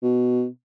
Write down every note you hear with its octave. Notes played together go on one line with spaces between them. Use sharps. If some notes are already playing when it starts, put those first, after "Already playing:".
B2